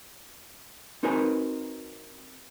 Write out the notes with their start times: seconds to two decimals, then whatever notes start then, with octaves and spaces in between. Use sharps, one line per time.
1.03 C4 D#4 F#4 A#4 B4 G#5